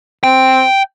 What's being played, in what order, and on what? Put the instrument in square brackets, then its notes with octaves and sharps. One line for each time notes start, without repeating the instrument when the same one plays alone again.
[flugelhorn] C4 [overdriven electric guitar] G5